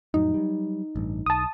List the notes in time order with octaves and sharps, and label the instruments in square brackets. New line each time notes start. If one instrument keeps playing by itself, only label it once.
[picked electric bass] F2 A2 F#3 [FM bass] D#4
[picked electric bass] F#3 G3
A1 G2
[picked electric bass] B1 [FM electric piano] A5 D#6